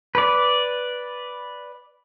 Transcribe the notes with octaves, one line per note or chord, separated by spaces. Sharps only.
B4 D5